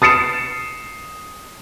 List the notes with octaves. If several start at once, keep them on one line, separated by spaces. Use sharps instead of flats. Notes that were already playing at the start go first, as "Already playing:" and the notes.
D#6 A6 C7 C#7 E7